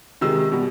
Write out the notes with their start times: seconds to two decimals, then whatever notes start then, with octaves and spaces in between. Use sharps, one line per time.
0.21 C3 D#3 G#3 E6
0.52 B2 G3